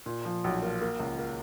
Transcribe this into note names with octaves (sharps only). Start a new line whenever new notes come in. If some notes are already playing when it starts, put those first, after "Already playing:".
A#2
F3
B1
A#3
A#3
C#2
A#3